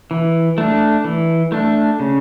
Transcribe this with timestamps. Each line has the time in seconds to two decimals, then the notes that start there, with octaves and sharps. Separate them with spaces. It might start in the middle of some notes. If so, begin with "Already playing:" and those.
0.11 E3
0.58 A3 D4
1.04 E3
1.52 A3 D4
1.99 C#3